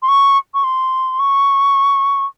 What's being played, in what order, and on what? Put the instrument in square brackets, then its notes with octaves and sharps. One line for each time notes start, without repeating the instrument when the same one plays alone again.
[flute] C6
C#6
C#6
C6
C#6